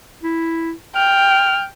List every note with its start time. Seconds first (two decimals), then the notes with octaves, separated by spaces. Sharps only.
0.23 E4
0.96 G5 F6